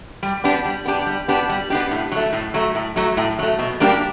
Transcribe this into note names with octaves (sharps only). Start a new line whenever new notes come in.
G3
B3 D4 G4
G3
B3 D4 G4
G3
B3 D4 G4
G3
B3 D4 G4
A2
F#3 A3
A2
F#3 A3
A2
F#3 A3
A2
F#3 A3
B2
G3 A#3 D4 G4